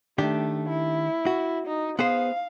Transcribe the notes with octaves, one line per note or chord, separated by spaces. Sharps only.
D#3 A3 D4 G4
E4
F#4
D#4
B3 G#4 C5 F5